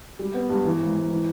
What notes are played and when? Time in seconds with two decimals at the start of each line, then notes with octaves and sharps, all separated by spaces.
0.19 G3
0.34 B3
0.50 G2
0.65 E3
0.80 G#1
0.95 G#1
1.11 E3